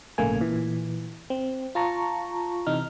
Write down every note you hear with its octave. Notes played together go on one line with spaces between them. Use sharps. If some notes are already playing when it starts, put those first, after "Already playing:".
A#1 G#2 C#3 A3 A#3 G#5
A#2 E3
C4
F4 A5 A#5 C#6
C3 E3 D#4 F6